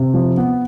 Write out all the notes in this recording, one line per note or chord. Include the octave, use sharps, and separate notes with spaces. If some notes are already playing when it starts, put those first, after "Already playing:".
Already playing: C3
F3
B3